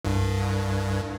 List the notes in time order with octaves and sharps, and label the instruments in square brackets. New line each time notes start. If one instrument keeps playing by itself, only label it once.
[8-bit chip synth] C2 G2